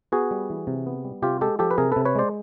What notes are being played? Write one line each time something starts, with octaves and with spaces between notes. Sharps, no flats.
B3 F#4 G#4
G3
E3
C3
B3
G3
C3 F4 G4
G#3 G4 A4
F3 G4 A4
B4
C3 G#4 A#4
C3 A4 B4
B4 C#5
G#3 C5 D5